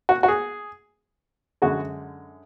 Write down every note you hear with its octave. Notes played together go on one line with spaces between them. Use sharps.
F#4
F#4
G#4
F#2 D3 G#3 F#4